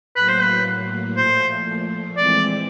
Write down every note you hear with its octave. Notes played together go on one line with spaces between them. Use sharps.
A2 F#3 A#3 B4
C5
B4
A#2 F3 A3 C5
E3 G#3 C4 E4 D5